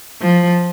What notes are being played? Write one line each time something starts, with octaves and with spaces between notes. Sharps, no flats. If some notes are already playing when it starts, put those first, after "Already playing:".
F3